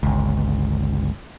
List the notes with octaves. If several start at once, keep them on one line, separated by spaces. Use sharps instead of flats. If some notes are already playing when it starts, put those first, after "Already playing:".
G1 C#2